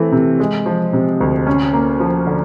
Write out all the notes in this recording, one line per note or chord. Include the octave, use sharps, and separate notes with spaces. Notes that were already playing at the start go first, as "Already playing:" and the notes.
Already playing: E3 A3 C4
C3
G#3
F3
C3
D2
C#4
A#3
F3
D3